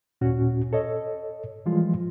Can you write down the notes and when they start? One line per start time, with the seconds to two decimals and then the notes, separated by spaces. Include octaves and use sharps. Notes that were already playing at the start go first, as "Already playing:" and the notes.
0.21 D#2 A#2 C#4 F#4
0.73 A4 C#5 D#5
1.66 E3 F3 G3 G#3 F4